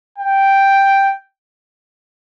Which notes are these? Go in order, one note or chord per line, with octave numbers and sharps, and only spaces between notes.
G5